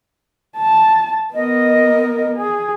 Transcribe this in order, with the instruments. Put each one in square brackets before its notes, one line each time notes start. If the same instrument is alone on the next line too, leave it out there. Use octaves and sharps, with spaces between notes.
[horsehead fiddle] A5
[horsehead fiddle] B3 A#4 [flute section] D#5
[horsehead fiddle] G#4